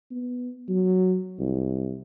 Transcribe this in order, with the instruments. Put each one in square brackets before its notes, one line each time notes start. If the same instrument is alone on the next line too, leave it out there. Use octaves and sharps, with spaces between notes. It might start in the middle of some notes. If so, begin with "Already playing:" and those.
[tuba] B3
F#3
C2